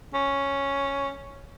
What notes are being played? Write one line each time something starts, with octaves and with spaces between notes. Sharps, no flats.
C#4